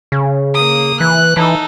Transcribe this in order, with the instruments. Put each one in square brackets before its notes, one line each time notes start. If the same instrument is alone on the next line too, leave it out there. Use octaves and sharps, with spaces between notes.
[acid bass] C#3
[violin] A#3 D#6
[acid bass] E3 [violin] F#6
[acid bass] E3 [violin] D#4 A4